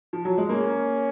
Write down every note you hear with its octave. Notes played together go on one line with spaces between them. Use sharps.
F3
F#3
G#3
A#3 C#4